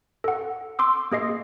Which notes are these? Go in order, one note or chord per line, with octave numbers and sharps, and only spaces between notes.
A4 F#5
C6 D6 E6
A#3 G#4 D#5 C7